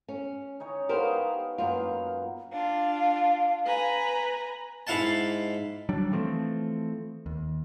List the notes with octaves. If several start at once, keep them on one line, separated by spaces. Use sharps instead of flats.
C#4
D#4 C#5 G#5
B3 G4 A#4 C5 F5
F#2 A#3 B3 F4
D4 F4 F5
B4 G#5 A#5
G#2 E4 F5 F#5 A5
F#3 G3 D4
E3 F3 A3 C4
D#2